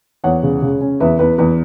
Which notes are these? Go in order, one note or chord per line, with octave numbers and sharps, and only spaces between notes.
E2 C#5 F#5
C#3
C#3
C#4
E2 B4 E5
E2 B4
E2 B4